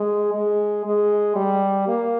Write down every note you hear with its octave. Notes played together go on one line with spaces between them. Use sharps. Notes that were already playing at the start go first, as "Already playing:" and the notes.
Already playing: G#3
G#3
G#3
G3
A#3